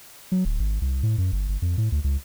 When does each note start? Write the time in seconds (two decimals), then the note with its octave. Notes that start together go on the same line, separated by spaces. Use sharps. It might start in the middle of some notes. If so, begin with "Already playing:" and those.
0.32 F#3
0.45 D1
0.59 G#1
0.81 C2
1.03 A2
1.18 F#2
1.32 G1
1.48 G1
1.62 F2
1.78 A2
1.92 D2
2.04 C#2